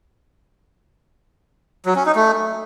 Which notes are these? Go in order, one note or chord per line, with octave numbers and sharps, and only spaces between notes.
F#3
C#4
D#4
A3